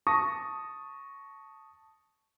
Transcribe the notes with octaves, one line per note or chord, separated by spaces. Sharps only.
A5 C#6 D#6 A#6